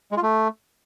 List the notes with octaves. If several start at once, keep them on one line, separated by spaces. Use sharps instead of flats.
G#3
F4
A3